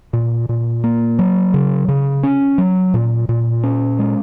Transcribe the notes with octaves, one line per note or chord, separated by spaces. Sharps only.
A#2
A#2
A#3
F#3
C#3
C#3
C#4
F#3
A#2
A#2
C#4
G#3